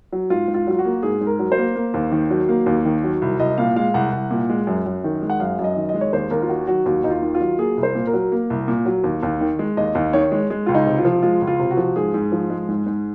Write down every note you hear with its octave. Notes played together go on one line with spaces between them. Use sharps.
F#3
G#2 F4
G#2
F4
F#3 F4
F#4
A#3
G#2 G#4
G#2
A#4
F#3
C5
A#3
A#3
D#2
D#3
F#3
A#3
D#2
D#3
F#3
C2
C2 D#5
A#2 F5
G#3 F5
C2 F#5
C2
A#2
G#3
F#2
F#2
D#3
G#3
F#5
F#2 F5
F#2
D#5
D#3
D#5
G#3
C#5
D#2 C5
D#2 A#4
F4
D#3 F#4
F#3 F#4
D#2 F#4
D#2 D#4
F4
D#3
F4
F#3
A#3 G#4
C2
C5
A#2
A#4
F#3
A#3
C2
A#2
F#3
D#2
D#2
D#3
G#3
D#2 D#5
D#2
D#3 C#5
G#3
G#3
C#2 F4
D#4
C3
F4
F3
G#3 F4
C#2
F4
C3
F#4
F3
G#2 G#4
G#2
F3
G#3
G#2
G#2